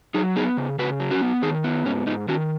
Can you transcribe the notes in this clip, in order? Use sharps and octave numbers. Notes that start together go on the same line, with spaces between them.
F#3 D#4 G#4
B3 D#4 G#4
C#3
C#3 F#4 B4
F#3
C#4 F#4
B3
D#3 D#4 G#4
B3
G#2 C#4
G#2 B3 D#4
D#3 C#4 F#4